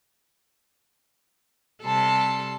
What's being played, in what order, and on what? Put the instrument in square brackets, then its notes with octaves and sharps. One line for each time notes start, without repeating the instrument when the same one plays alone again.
[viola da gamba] C3 G3 A4 [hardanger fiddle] A5 C6